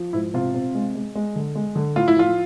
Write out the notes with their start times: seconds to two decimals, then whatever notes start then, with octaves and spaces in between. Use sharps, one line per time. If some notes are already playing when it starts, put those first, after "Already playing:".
Already playing: F3
0.13 G#2 E4
0.34 C3 F4
0.54 C3
0.75 G#3
0.95 G#3
1.15 G#3
1.36 D3
1.55 G#3
1.76 D3
1.96 A2 F4
2.08 E4
2.16 F3 F4